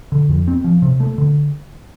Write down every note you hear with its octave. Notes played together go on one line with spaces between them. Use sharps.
D3
F2
C4
F3
C3
A3
D3